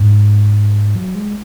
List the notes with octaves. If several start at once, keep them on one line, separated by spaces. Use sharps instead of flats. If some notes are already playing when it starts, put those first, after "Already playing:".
Already playing: G#2
F#3
G#3